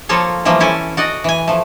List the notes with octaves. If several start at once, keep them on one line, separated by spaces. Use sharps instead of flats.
F3 A#3 F4 A4 C#5
E3 F3 G3 A3 A#3
C#4 E4 A4 G#5
F#4 D5 D#5
E3 G#5
F3 A3